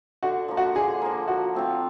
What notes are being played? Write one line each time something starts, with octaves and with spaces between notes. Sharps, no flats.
D3 F#4
F3 A#3
F#4
D3 G#4
F3 A#3
F3 F#4
A3 C4 F4